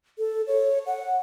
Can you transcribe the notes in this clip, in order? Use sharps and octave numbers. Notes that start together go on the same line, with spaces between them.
A4
C#5
F#5